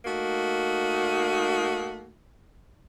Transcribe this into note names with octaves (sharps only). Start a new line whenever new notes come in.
A3 A#3 D#4 F#4